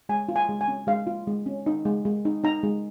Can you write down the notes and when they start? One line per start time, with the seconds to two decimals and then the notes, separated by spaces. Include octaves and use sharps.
0.09 G#3 G#5
0.29 F4
0.36 G#5
0.49 G#3
0.61 G#5
0.68 C#4
0.87 G#3 F5
1.07 F4
1.27 G#3
1.46 C#4
1.66 D#4
1.85 G#3
2.05 G#3
2.25 D#4
2.44 D#4 A#5
2.63 G#3